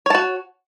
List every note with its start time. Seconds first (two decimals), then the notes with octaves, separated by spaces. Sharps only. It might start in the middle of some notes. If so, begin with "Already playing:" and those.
0.06 C#5
0.10 A5
0.15 F#4